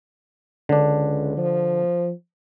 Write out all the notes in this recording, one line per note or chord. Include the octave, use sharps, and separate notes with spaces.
C#2 D3 D4
F3